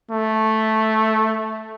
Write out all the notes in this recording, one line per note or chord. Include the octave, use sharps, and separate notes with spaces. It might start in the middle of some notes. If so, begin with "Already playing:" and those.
A3